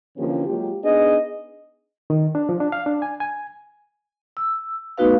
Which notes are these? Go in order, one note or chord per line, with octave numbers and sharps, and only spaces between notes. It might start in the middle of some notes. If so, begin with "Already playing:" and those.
D3 E3 F3 A#3 C#4 G4
F#3 G#3 A#3 F4 G4
B3 D4 D#4 G#4 D#5
D#3
D4
F3
D4
F5
D4
G#5
G#5
E6
A3 B3 D#4 F#4 B4 F5